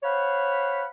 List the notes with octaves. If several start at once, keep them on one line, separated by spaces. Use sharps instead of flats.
C5 C#5 F5 F#5 B5